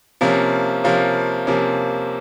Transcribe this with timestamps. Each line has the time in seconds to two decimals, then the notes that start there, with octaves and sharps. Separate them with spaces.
0.21 C3 F3 A#3 C#4
0.84 C3 F3 A#3 C#4
1.47 C3 F3 A#3 C#4